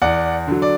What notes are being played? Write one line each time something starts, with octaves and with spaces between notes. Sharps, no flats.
E2 D5 F#5
D3 F#3
D5